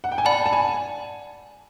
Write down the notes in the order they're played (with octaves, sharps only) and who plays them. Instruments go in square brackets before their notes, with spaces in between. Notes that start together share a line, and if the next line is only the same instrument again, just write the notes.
[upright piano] F#5
G5
G#5
[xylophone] D5 F#5 B5 [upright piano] A5
[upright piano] A5
G#5